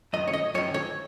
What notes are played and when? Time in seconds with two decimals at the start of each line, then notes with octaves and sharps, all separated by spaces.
0.13 F#2 D#5
0.17 D#3
0.28 C#5
0.33 D#5
0.54 F#2 C#5
0.58 D#3
0.74 C#5